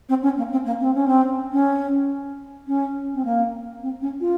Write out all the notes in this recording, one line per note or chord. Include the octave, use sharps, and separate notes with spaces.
C4
C#4
A#3
C4
A#3
C4
C#4
C4
C#4
C#4
C4
A#3
C4
C#4
F4